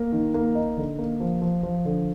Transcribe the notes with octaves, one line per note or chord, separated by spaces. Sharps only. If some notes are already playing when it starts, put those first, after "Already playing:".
Already playing: A#3
D#3
A#3
D#4
D3
A#3
F3
F3
F3
D3